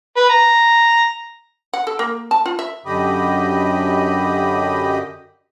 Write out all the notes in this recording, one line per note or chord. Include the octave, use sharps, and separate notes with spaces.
B4
A#5
F#5
A4
A#3
A5
F4
E5
F#2 D3 G4 D#5 B5